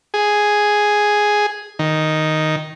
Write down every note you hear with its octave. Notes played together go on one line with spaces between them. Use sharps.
G#4
D#3